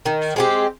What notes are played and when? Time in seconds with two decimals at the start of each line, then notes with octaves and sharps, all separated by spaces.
0.06 D#3
0.36 G#3 C4 G4